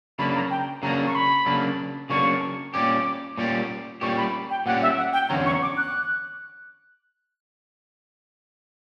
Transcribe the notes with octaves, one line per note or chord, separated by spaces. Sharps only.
C#3 F#3 A#3 D4 B5
A#5
G5
C#3 F#3 A#3 D4 A#5
C#6
B5
C#3 F#3 A#3 D4
C#3 F#3 A#3 D4 C#6
A#2 G3 C#4 G4 D6
A#2 G3 C#4 G4
A#2 G3 C#4 G4 C#6
B5
G5
A#2 G3 C#4 G4 F#5
E5
F#5
G5
E2 D3 F#3 C#4 A#5
C#6
D6
F#6